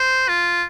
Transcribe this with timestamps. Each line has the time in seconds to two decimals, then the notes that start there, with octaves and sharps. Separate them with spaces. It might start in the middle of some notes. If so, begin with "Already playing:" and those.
Already playing: C5
0.29 F4